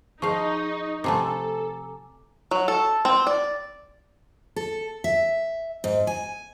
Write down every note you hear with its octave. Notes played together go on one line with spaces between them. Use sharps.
F3 D#4 G#4 F5 C#6
C3 F3 A3 A4 G#5 A#5 D6
F#3
A4
C4
D5
A4
E5
G#2
G#5